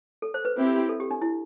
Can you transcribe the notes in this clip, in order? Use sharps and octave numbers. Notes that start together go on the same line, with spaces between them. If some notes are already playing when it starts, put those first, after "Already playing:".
A4
C5
B4
C4 E4 G4
A4
G4
D4
E4